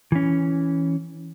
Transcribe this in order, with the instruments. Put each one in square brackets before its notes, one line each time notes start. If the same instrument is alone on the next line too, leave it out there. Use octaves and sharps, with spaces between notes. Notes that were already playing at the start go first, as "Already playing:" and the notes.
[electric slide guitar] E3 C#4